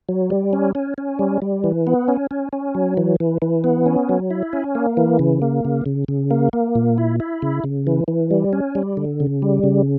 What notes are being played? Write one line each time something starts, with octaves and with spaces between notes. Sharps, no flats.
F#3
G3
C#4
C#4
C#4
G3
G3
E3
B3
C#4
C#4
C#4
F#3
E3
E3
E3
B3
C#4
F#3
E4
C#4
A#3
E3
C#3
A#3
C#3
C#3
C#3
A#3
A#3
A#2
E4
E4
C#3
C#3
E3
E3
G3
C#4
G3
D3
C#3
G3
C#3